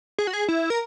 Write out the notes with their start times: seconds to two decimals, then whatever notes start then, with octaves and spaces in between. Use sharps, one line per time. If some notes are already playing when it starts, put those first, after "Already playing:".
0.19 G#4
0.27 F#4
0.33 G#4
0.49 E4
0.70 A#4